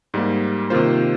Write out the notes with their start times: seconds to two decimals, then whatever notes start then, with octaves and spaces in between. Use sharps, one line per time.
0.14 G#2 G3 A#3
0.70 C3 D#3 A#3 F4 C5